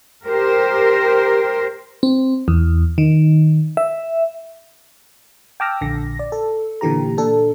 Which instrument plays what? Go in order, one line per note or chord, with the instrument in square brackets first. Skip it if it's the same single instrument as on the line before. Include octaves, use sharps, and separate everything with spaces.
[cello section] G4 A#4 C5
[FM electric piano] C4
E2
D#3
E5
G5 A5 D6 E6 F6 A#6
A#1 D3 A#6
D5
A4
A#2 D3 E3 G4 A#5
A#2 D4 A4